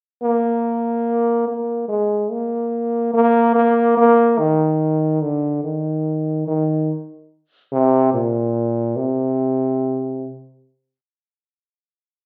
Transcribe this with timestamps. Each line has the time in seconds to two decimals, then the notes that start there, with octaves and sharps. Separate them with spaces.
0.23 A#3
1.48 A#3
1.89 G#3
2.31 A#3
3.14 A#3
3.55 A#3
3.97 A#3
4.39 D#3
5.22 D3
5.64 D#3
6.48 D#3
7.72 C3
8.14 A#2
8.97 C3